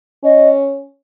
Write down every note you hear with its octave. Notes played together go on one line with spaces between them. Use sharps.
C#4 D#5